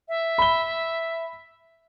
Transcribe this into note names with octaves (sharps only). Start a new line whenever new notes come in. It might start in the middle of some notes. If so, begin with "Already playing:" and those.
E5
B5 G7